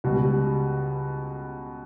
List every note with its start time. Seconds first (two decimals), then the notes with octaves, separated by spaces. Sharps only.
0.04 C#2 B2 G3